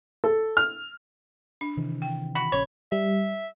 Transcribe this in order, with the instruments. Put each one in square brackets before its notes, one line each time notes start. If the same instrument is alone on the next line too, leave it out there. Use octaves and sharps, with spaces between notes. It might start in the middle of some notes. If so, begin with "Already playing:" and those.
[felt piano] A4
F6
[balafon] D4
[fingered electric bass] C3 D#3 E3
[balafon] G5
[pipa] F#4 [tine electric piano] B5
[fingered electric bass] A#1 C#3 C#4 [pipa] C#5
[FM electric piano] G3 [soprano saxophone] E5